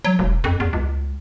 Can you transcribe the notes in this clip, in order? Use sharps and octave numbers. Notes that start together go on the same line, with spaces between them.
F#3
E1
F2
E2
C#2